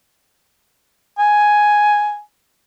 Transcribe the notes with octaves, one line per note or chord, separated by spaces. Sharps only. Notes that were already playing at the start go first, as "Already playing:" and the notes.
G#5